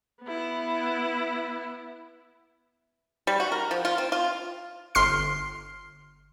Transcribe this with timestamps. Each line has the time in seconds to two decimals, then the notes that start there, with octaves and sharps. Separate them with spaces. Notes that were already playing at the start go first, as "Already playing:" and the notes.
0.23 B3 E4
3.27 G3
3.40 F#4
3.52 A#4
3.71 F3
3.85 F4
3.98 C4
4.12 F4
4.95 G1 C6 F6 C7